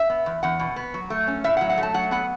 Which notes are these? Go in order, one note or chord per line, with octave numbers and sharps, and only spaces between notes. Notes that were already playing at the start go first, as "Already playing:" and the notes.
Already playing: E5
B3
E2
E2 F#5
B2
B3
F#3
A3
C#4
A2 E5
F#5
F#3
F#5
A3
A5
F#3 F#5
B3 F#5